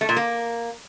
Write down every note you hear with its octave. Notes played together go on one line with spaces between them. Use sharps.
A3
A#2
A#3